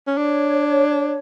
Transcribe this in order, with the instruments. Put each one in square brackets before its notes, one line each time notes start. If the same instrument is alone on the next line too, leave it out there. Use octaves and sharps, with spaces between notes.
[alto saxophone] C#4
[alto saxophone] D4 [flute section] C#5